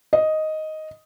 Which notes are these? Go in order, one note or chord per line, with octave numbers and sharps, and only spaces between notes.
D#5